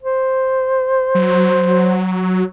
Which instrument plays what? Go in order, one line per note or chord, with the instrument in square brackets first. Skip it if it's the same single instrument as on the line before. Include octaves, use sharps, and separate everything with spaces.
[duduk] C5
[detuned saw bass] F#3